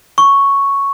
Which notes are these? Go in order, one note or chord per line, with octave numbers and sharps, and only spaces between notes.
C#6